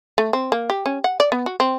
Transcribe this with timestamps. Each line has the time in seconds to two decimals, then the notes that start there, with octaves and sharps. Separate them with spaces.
0.18 A3
0.33 C4
0.52 A#3
0.70 G4
0.86 C#4
1.04 F#5
1.20 D5
1.32 B3
1.46 F#4
1.60 C4